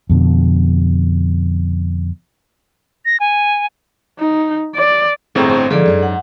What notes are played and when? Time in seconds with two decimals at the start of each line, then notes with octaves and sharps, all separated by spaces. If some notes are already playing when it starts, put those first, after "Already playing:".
0.10 F2 B2 D3
3.05 A#6
3.20 G#5
4.19 D#4
4.75 D5
5.35 G1 A2 C4 G#4 A4 G5 A#5 C#6
5.49 C5 A5
5.70 G#2 D3 F3 A#3 G#4 A4 D5
5.86 F#2 D4 D#4
6.03 F#5